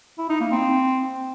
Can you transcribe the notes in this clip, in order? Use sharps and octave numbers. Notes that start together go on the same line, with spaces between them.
E4
D#4
A#3
C4